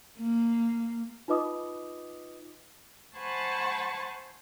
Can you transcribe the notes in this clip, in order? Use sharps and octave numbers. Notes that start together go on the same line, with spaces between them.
A#3
D#4 F4 B4 D#5 D6 D#6
C5 F#5 G#5 A5 B5 C#6